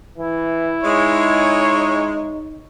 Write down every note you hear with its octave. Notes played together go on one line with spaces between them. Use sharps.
E3 E4
G#3 D#4 C#5